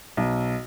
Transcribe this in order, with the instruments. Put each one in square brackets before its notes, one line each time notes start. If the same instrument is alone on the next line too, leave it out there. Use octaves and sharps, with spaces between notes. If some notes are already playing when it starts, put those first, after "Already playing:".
[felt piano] B1